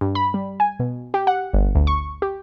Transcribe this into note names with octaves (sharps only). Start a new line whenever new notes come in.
G2
B5
G3
G#5
B2
G4
F#5
G1
D2
C#6
G4